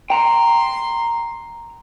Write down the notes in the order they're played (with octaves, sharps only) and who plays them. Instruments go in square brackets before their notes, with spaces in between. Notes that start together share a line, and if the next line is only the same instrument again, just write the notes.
[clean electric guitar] G5 A#5 [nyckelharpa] C6